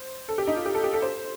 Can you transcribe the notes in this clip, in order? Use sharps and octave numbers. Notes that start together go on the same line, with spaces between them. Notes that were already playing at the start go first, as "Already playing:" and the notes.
Already playing: C5
A4
G4
D#4
F4
G4
A4
G4
A4
C5